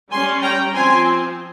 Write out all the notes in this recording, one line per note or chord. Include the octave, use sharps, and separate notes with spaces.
G3 C#4 G#5 C6
G5 A#5
F3 C4 G#5 C6